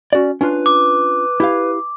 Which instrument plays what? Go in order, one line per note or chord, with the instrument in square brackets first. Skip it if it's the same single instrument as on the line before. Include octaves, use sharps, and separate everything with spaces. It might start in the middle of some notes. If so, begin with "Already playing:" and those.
[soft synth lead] C#4 [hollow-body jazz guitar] F#4 D5
[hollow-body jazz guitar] C#4 D4 F4 [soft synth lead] B4
[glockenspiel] D6
[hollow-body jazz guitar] E4 G4 F5